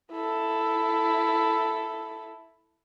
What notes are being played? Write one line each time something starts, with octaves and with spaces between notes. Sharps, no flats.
E4 A4